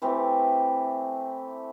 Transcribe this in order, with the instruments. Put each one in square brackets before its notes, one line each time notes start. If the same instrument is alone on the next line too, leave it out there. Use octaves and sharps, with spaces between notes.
[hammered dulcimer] E3 A3 C4 G4